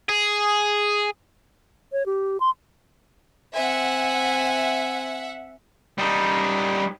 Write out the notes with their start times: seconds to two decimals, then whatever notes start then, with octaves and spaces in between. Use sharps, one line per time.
0.09 G#4
1.92 C#5
2.06 G4
2.40 C6
3.54 C4 E5 F#5 G#5
5.99 G3 D#4